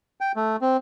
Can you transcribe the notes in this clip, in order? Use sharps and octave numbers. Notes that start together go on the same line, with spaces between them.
G5
A3
C4